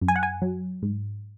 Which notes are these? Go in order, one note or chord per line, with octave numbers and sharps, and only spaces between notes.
F#2
G#5
F#5
G#5
F#3
G#2